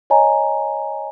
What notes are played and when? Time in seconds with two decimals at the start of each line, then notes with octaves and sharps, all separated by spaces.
0.10 C#5 D#5 G#5 A#5